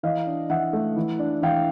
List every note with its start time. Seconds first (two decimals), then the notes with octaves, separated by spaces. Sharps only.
0.03 E3 D#5 F5
0.27 D4
0.50 E3 E5 F#5
0.73 A3
0.96 E3
1.19 D4
1.42 E3 F5 G5